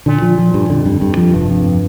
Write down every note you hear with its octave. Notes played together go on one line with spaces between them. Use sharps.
A#2 D3
F3
F3
G2
F2 D3
G2
G2
F3
F1 G2
F2